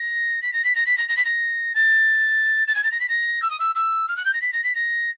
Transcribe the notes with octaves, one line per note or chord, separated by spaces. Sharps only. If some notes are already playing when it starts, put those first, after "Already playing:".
Already playing: A#6
B6
A#6
B6
A#6
B6
A#6
A#6
B6
A#6
A6
A6
G#6
A6
A#6
B6
A#6
E6
D#6
E6
E6
F6
F#6
G6
A#6
B6
A#6
B6
A#6